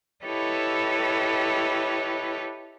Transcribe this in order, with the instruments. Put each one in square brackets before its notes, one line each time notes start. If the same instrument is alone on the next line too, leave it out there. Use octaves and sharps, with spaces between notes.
[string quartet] E4 G4 A4 B4 C#5 D#5